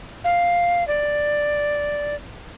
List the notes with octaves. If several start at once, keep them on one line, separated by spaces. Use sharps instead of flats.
F5
D5